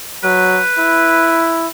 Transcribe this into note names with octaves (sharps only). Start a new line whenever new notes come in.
F#3 B4
E4